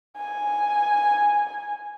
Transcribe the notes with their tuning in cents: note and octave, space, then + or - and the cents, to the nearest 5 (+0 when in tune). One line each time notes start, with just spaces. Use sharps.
G#5 -5